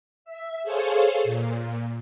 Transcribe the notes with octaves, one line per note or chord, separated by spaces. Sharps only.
E5
G#4 A4 C5 C#5 F5
A#2